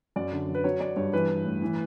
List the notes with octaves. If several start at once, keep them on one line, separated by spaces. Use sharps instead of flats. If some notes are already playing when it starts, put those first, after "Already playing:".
F#2 D5
D3
F#3
B4
F#3 C#5
F#3 D5
G2 C#5
E3 B4
E3
A2
E3